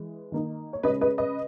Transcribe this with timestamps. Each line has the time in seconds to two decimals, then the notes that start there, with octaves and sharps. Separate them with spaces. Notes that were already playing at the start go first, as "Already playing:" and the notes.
Already playing: E3 G#3
0.32 D#3 A#3 D#4
0.73 C#5
0.83 C#3 G#3 C#4 B4 D#5
1.01 B4 D#5
1.18 B4 D#5